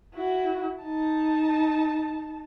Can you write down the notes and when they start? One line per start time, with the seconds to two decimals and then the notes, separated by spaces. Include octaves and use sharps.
0.14 E4 F#4
0.83 D#4 A5